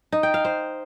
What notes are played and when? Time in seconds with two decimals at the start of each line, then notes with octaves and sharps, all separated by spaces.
0.12 D#4
0.23 G5
0.34 F5
0.45 C5